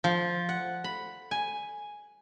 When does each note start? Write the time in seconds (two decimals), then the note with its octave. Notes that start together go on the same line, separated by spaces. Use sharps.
0.04 F3
0.49 F#5
0.84 B5
1.31 G#5